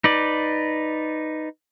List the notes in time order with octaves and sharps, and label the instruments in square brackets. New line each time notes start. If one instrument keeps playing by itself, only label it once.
[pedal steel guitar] D#4 B4 D5